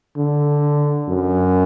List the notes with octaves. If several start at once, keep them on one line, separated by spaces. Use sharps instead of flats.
D3
F#2